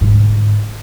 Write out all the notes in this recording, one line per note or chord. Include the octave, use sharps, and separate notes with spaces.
G#2 D3